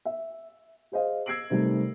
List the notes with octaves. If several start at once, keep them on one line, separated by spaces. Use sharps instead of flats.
E5
G#4 C5 D#5 F5
E6 G#6 A#6 C7 D7 F#7
C3 D#3 G3 A3